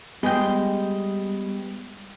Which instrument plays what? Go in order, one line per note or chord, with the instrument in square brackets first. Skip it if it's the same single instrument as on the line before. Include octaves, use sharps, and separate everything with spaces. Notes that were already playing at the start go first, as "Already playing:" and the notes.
[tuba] G3 [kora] G#3 G#4 [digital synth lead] B3 [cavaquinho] D#5 G5